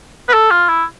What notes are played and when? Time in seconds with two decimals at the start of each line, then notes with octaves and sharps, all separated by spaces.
0.29 B4
0.34 A4
0.51 F4
0.68 E4